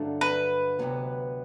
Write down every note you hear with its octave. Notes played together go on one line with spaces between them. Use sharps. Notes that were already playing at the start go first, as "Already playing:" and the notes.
Already playing: G2 D3 F#3 A3 D4
B4
D2 C3 F#3 B3